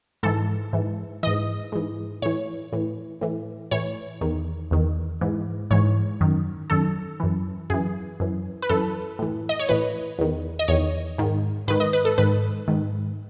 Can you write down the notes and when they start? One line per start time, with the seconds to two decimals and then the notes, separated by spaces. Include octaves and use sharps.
0.23 G#2 E3 A4
0.73 G#2 E3
1.23 G#2 E3 D#5
1.72 G#2 E3
2.22 A2 E3 C#5
2.73 A2 E3
3.21 A2 E3
3.71 A2 E3 C#5
4.21 E2 D#3
4.71 E2 D#3
5.21 G#2 E3
5.71 G#2 E3 C#5
6.20 F#2 D#3
6.70 F#2 D#3 A4
7.20 F#2 E3
7.70 F#2 E3 G#4
8.20 F#2 E3
8.62 B4
8.69 F#2 E3 A4
9.19 A2 E3
9.49 D#5
9.59 C#5
9.69 A2 E3 B4
10.19 E2 D#3
10.59 D#5
10.68 E2 D#3 C#5
11.18 G#2 D#3
11.68 G#2 D#3 B4
11.80 D#5
11.93 B4
12.05 A4
12.18 G#2 D#3 B4
12.68 G#2 D#3